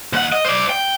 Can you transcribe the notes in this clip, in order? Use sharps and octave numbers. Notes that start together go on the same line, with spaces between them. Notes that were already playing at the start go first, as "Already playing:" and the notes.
D#2 F#5
D#5
C5 D5
G5